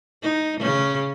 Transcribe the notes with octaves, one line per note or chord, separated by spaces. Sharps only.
D#4
C#3 C#4